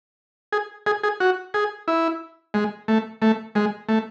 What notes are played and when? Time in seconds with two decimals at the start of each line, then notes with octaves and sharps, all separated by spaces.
0.53 G#4
0.86 G#4
1.04 G#4
1.20 F#4
1.54 G#4
1.88 E4
2.54 G#3
2.88 A3
3.22 A3
3.55 G#3
3.89 A3